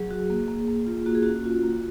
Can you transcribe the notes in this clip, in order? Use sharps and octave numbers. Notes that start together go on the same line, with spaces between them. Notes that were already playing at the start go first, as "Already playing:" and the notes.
Already playing: F#3 G#4
F#4
A#3
A#3
A#3
F4
A#3 F#4
G#4
C#4 F#4
F4
A#3